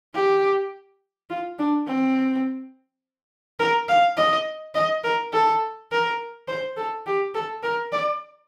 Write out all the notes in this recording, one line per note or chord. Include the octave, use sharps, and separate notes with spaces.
G4
F4
D4
C4
A#4
F5
D#5
D#5
A#4
A4
A#4
C5
A4
G4
A4
A#4
D5